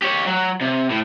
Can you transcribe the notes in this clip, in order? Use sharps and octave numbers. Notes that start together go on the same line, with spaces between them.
G4 C#5
F#3
C3
A2